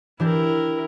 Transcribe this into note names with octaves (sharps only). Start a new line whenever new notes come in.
E3 D4 E4 G4 A#4